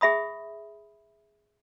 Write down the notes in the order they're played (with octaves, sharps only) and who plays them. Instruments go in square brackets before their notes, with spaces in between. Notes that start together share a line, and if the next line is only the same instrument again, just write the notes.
[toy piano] G#4 E5 B5 D#6